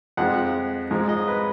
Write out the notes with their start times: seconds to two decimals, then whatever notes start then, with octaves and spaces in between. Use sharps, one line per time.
0.17 F2 F3 G#3 F#5
0.91 G#2 F3 G#3
1.09 D#5
1.28 B4